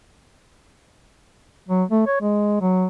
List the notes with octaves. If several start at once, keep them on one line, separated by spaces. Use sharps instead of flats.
F#3
A3
C#5
G#3
F#3